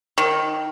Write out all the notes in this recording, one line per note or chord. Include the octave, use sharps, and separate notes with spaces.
D#3